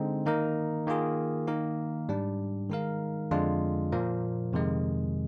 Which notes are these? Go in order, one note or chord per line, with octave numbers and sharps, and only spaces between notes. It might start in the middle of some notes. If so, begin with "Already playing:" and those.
Already playing: D3 G#3 C4 D#4
D#3 A#3 D#4 A#4
D#3 A#3 F4 G#4
D#3 A#3 D#4 A#4
G#2 G3 D4
D#3 G#3 D#4 A#4 F5
F2 D3 G#3 D4 F4
A#2 F3 A#3
F2 C3 D#3 G#3